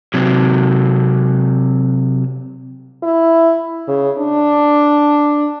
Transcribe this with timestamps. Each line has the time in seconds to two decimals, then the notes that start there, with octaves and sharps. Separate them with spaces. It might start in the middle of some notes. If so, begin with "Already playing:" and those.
0.14 C3 F#3
3.03 E4
3.88 C#3
4.18 D4